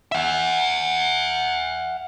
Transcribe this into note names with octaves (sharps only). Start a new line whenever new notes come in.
E5 F#5